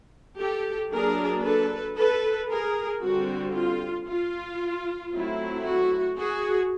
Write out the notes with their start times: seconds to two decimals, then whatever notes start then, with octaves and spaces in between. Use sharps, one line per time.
0.38 G4 A4
0.91 F#3 A#3 D4 G#4 A#4
1.43 A4 B4
1.96 A4 B4
2.49 G#4 A#4
3.01 D3 G3 C4 F#4
3.55 F4
4.07 F4
5.13 F#3 A3 C4 E4
5.66 F#4
6.18 F#4 G#4